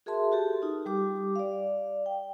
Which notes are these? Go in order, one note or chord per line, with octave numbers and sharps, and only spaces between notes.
F#4 G#4 A#4 E5 A5 C6
F#4 G4 A4
D#4 F4
G3 G4 D6
D5 F5
G5